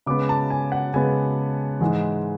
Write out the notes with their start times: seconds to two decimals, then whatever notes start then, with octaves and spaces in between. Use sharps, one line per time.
0.06 C#3 G#3 B3 D6
0.29 A5
0.50 G#5
0.72 F#5
0.94 C#3 G#3 B3 G#5
1.81 G#2 E3 G#3